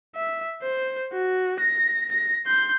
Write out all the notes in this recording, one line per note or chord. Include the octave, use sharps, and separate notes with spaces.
E5
C5
F#4
A#6
A#6
C6 G6